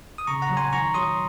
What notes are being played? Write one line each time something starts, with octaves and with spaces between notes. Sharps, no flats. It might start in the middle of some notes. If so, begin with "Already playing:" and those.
D#6
C#3 A#5 C#6
F#5 A#5
F#3
G#5 C6
D#3 A#5 C#6
F#3 C6 D#6